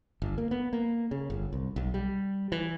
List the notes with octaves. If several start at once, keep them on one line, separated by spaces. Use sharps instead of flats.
G1
A#3
B3
A#3
C#3
G1
C2
B1
G3
E3